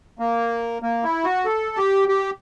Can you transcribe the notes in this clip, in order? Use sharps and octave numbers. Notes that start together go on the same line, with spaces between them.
A#3
A#3
E4
F#4
A4
G4
G4